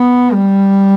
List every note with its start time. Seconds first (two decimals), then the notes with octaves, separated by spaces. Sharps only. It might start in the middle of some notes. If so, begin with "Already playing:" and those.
Already playing: B3
0.33 G3